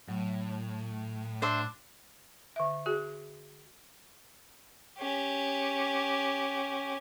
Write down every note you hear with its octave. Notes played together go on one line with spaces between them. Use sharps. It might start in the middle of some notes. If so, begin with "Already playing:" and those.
A2 F#3
D4 C5 E5
D3 E5
F#4 G#4
C#4 G4